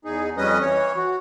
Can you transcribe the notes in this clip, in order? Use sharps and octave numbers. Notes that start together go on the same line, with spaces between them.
E2 D#4 G#4
F2 G3 C#4 B4 D#5 D#6
E3 C#5
F#4